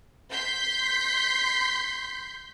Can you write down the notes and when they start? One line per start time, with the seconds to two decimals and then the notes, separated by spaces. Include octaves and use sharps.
0.31 C6 G6 B6